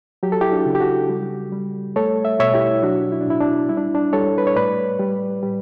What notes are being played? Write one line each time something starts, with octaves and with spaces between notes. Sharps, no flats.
F#3 G4
A4
E4 G4
D4 F#4
C#3
G4
F#4 A4
G3
G3
A3 A4 C#5
E5
B2 C#5 E5
E4 G4
F#3 D4 F#4
E4
D4
A2 E4
D4
G3 E4
D4
D4
G3 A4 C#5
B4
C#5
A2 B4 D5
G3
G3